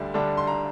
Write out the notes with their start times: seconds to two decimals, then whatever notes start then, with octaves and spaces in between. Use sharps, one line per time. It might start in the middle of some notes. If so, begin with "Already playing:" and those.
Already playing: D2 D3 G3 D4
0.14 D3 G3 D4
0.37 C6
0.47 A#5